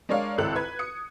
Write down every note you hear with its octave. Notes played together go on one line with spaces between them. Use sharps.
G#3 D4 A#4 C#5 D5 F5
G#1 C#2 E4 A4 F#6 F#7
B4 G#6
D#6 C#7